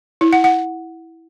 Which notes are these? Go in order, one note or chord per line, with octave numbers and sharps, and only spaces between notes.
E4
F#5
F#5